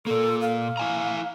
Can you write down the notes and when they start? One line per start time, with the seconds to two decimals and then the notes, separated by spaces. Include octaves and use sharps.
0.07 A#2 A#3 A4
0.41 F5
0.77 E4 G#5 A#5